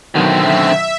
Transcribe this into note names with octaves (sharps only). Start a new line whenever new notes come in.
B2 D3 D#3 F#3 C4 E5